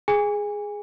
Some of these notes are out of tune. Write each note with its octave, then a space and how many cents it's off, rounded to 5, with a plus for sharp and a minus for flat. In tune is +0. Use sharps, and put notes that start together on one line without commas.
G#4 +0 G#5 -25